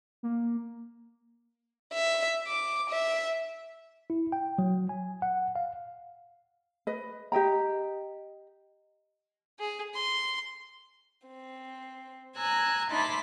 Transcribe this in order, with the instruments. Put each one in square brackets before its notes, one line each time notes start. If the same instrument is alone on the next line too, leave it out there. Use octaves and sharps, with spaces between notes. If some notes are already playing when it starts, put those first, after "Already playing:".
[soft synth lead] A#3
[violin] E5
D6
E5
[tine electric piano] E4
G5
F#3
G#5
F#5
F5
[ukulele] B4 D#5
G4 D#5 G5 A#5
[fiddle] G#4
C6
[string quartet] C4
G#5 A#5 E6 F#6 G#6
D#4 E5 A5 B5 C6 D6